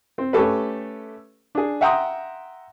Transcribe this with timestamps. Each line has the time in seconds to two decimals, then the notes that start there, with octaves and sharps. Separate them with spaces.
0.18 C4
0.33 A3 C#4 G4 A4 B4
1.55 D4 G#4
1.81 E5 F#5 G5 A#5 C6 D#6